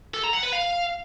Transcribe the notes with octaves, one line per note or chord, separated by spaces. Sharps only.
A4
A#5
F#5
B4
F5